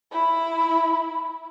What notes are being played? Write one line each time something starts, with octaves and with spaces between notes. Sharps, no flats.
E4 B5